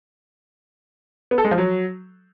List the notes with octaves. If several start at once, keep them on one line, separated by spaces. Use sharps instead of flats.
B3
A4
G#3
F3
F#3